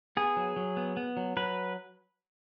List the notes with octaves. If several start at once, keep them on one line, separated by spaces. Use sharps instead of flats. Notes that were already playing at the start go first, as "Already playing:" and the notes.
B3 G#4
F#3
F#3
B3
B3
F#3
F#3 B4